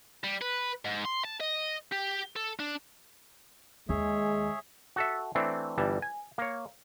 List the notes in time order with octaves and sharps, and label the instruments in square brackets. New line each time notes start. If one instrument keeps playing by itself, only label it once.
[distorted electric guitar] G3
B4
G#2
C6
A5
D#5
G4
A4
D4
[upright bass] D#2 [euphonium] G#3 [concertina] G#4 C#5 E5
[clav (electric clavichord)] F#4 A4 E5
E3 A3 C4 D4
G1 E3 G3 A5
G#5
A#3 C#5